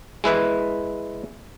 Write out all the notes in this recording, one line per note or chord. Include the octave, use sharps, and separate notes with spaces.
G#3 E4 B4 E5